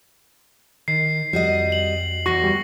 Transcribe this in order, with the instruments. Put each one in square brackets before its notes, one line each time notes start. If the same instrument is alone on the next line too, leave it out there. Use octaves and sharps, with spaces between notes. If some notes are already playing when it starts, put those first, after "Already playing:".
[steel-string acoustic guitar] D#3 [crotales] C7
[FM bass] F2 [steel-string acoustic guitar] G3 F#4 D#5
[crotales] F#7
[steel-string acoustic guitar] E2 F#4 [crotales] C#6 A#6
[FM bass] G3